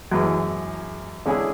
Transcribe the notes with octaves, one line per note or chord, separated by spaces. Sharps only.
F#2 E3 G#3
D3 G#3 C#4 E4 G#4